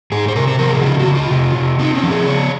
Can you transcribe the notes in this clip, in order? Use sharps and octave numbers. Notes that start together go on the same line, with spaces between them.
G#2 G#4
C5
C3 A#4
C5
F3 A#4
G#4
C#3 F4
F#4
C#3
F4
C3
C3
C4 D#4
C#4
F3
G#4
C#3 C#5